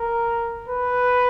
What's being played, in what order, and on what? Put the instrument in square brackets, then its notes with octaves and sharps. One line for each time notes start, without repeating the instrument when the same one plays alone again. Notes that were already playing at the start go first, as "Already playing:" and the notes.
Already playing: [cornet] A#4
B4